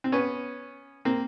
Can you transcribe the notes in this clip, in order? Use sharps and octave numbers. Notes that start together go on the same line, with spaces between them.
C4
B3 C#4
A#3 C4